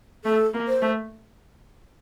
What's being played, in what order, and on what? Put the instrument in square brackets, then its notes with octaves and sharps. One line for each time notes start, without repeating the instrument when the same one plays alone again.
[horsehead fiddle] A3 [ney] A4
[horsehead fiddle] A#3
[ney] C5
[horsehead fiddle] A3